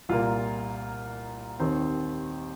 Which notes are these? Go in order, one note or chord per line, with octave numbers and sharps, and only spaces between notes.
C2 A#2 A#3 F4
D#2 D#3 C4